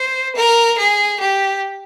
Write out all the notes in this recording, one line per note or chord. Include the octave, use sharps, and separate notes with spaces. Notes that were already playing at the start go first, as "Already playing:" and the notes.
Already playing: C5
A#4
G#4
G4